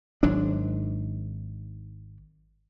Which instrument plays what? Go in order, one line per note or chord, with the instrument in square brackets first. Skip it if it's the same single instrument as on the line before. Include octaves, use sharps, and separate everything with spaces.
[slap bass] G#1 G#2 F#3 D4